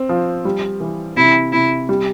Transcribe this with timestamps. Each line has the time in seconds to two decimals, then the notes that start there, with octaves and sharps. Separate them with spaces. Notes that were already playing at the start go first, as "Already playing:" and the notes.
Already playing: C4
0.09 F3
0.45 G3
0.80 E3
1.17 C3 E4
1.52 C3 E4
1.89 G3